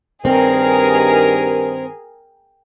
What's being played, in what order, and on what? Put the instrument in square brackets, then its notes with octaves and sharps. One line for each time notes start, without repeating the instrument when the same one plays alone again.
[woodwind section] G2 D#3 [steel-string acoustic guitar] C4 [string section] G#4 A#4